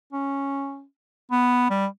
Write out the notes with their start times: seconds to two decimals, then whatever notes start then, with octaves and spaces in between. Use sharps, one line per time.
0.13 C#4
1.31 B3
1.70 G3